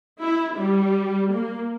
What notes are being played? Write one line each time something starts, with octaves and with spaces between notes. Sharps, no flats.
E4
G3
A#3